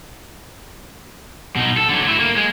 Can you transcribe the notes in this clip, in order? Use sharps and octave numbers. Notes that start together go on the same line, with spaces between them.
B2 D#4
A4
D3 F#3
A3 E4
A#3
G#3